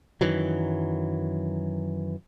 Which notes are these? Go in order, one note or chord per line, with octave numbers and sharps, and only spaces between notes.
F#2 D#3 E3 F#3